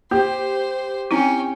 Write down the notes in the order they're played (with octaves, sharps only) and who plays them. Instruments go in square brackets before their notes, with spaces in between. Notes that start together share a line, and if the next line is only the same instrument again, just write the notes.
[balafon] A#3 [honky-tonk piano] G4 [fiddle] C5
[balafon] C4 D#4 E4 [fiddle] C#4 G5